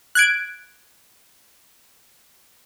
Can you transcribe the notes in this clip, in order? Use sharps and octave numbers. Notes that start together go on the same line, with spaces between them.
F#6 G#6 D7